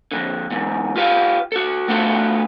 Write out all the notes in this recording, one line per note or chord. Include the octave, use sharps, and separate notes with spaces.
F2 G#2 D3
E2 G#2
F4 G4 B4 F5
F#4 A4
A3 B3 D4 F4 F#4 A4